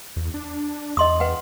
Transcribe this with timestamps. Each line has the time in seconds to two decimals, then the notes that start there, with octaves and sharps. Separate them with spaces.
0.16 E2
0.34 D4
0.97 E2 D#5 C6 D#6
1.20 B4 F#5 G5